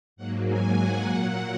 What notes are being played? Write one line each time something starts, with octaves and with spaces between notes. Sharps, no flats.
G#2 F#3 A#3 F#5
G#5
F#5
A#2 F#3 A#3